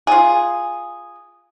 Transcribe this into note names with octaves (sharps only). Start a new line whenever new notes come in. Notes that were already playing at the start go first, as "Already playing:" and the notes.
F4 G#4